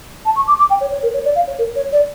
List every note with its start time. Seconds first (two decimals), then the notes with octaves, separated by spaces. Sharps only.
0.25 A5
0.36 C#6
0.47 D6
0.59 D6
0.70 G5
0.81 C#5
0.91 C#5
1.03 A#4
1.14 C#5
1.25 D5
1.36 F5
1.47 C#5
1.59 A#4
1.76 C#5
1.92 D5